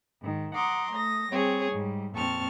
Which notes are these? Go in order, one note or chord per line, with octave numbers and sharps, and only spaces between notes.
G#2 D#3
F#5 A#5 C6 D6 D#6
A3 D#6 A#6
G3 C4 G#4 C#5
G#2 G3
F2 A#2 C4 A5 C#6 F6